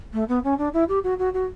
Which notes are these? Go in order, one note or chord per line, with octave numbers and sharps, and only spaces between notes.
A3
B3
C#4
D4
E4
G4
F#4
F#4
F#4